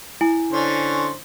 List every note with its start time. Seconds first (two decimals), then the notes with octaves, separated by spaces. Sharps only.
0.21 E4 G#5
0.52 D3 C#4 C5